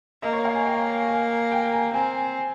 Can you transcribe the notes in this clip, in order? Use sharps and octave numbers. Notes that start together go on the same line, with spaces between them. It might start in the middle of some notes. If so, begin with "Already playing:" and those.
A#3 D#5
C#5
F5
G#5
G5
G#5
G5
G#5
C4 G#5